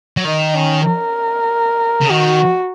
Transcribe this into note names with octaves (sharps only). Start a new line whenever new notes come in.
F#3
D#3 D#4
C#4
A#4
C#3
D#3 F#4